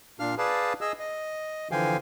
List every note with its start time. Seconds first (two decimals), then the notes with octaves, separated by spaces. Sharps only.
0.20 A#2 D4 F5 F6
0.38 G#4 B4 D5 F5 A5
0.81 G#4 D#5 E6
0.99 D#5
1.71 D3 E3 F3 F5 G5 G#5